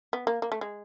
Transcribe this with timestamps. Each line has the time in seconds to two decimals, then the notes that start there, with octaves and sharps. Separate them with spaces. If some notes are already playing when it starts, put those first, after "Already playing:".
0.13 B3
0.27 A#3
0.42 A#3
0.52 A3
0.61 G#3